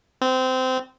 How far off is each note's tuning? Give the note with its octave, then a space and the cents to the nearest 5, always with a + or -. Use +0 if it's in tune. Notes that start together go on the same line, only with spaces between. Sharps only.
C4 -20